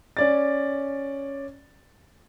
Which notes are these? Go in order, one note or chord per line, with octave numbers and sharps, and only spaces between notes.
C#4 D5 A6